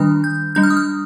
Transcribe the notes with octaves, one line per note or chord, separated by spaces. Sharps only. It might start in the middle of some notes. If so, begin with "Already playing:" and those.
Already playing: D#3 G3 D4 D#6 F6
G6
G3 D4 G6
F6
D#6
F6